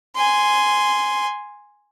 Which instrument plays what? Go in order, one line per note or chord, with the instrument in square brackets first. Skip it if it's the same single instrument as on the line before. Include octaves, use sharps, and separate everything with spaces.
[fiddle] G#5 C6